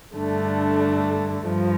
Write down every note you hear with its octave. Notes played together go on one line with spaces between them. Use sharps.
G2 D3 A3 D4
G2 F3